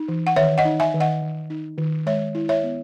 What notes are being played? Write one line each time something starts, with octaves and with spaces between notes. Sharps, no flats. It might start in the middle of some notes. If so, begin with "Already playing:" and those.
Already playing: D#4
E3
F#5
D#3 C#5 E5
D#5 F#5
D#4
E5 G#5
D#3
D#5 F#5
D#3
D#4
D#3
G#3 C#5 E5
E4
C#5 E5
B3